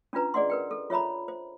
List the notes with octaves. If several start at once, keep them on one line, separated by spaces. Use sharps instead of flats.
C#4 D4 F4 B4 A#5
G#4 D5 D#5 F#5 C6
A#4 B4 G5
A4
F4 C#5 E5 A#5 B5
C5